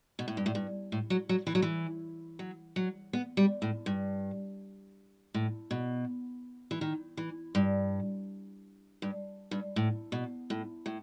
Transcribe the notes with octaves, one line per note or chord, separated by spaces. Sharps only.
B2
A2
G2
A2
G2
A2
F#3
F#3
E3
F#3
E3
F#3
F#3
B3
G3
A2
G2
A2
B2
E3
D#3
E3
G2
G2
G2
A2
B2
A2
A2